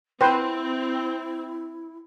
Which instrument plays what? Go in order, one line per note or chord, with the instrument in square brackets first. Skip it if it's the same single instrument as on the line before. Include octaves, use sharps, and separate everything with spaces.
[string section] C4 [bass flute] E4 [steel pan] B4 C5 [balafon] G5